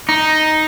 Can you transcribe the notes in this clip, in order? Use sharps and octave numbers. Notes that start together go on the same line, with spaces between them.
D#4